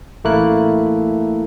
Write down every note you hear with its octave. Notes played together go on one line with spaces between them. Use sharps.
A1 A3 A#3 E4 A#4 F#6